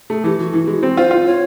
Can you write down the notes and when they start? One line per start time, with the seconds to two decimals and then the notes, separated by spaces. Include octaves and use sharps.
0.10 A3 G#4
0.24 E3 G4
0.39 E3 F#4
0.53 E3
0.67 G#3
0.83 C4
0.97 F4 C5
1.11 F4
1.26 C#5